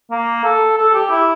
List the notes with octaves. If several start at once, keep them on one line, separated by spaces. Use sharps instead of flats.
A#3
A4
A4
G4
E4